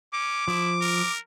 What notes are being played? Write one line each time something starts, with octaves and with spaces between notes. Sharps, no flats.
C#4 D6
F3 E4
A#4